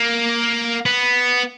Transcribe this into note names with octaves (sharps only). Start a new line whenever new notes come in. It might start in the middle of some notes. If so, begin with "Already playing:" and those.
Already playing: A#3
B3